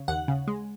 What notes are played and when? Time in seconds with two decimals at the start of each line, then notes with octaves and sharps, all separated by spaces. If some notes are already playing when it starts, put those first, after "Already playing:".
Already playing: C#3
0.08 D#2 F#5
0.28 C#3
0.47 G#3